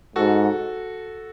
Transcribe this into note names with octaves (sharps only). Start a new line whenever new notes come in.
G#2 F#4 A4